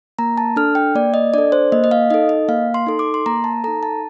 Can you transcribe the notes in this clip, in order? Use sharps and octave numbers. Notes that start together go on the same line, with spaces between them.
A#3 A#5
A5
D4 A4 F6
G5
A#3 D5
D#5
D4 A4 D5
C5
A#3 D#5
D#5
F5
D#4 A4 D#5
D#5
A#3 F5
C6
D#4 A4
D6
C6
A#3 A#5
A5
D#4 A4 A#5
A5